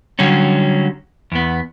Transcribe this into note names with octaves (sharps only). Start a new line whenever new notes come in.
D3 F#3 G3 C#4
E2 B3